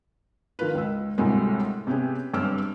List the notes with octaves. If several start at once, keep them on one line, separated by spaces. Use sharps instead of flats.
D#3 F3 F4 A#4 B4
C#2 E6
D2 A2 C3 G3 G#3 A#3
C3 B3 C#4 G4 G#4
G1 G2 C4 D6 E6 F6